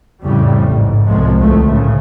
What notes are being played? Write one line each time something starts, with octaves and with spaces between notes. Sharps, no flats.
F2 A2 C#3 G3
A1 G#2
C2 A2 F3 G#3 A3
D2 D#3 A3
A2 C#3